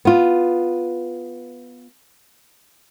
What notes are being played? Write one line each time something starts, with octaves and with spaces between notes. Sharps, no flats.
B3 F4